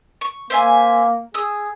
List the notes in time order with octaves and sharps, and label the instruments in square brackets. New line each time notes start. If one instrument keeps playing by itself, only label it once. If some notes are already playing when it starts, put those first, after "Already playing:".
[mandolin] C#6
[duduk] A#3 [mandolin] C5 E5 G#5
[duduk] G#4 [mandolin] D#6 E6